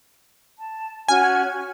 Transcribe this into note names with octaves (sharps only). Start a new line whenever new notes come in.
A5
C#4 F#4 G#5 F6
F#4